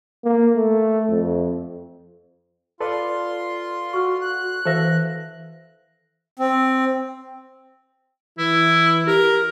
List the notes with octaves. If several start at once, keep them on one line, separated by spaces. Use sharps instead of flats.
A#3
A3
F2
F4 A4 B4 D5 C6
F#4 C#6 F6
F#6
E3 A4 C5 E5 F5 A#6
C4
E3 E4
G4 A#4